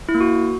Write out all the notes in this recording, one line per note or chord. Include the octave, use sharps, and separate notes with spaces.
E4
A#3
F#4